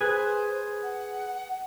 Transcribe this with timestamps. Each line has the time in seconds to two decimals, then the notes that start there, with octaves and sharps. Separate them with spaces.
0.01 G#4 B4 C5 G#5
0.83 F#5